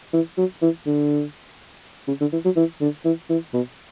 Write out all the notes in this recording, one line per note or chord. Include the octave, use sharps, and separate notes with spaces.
E3
F#3
E3
D3
C#3
D3
E3
F#3
E3
D3
E3
E3
B2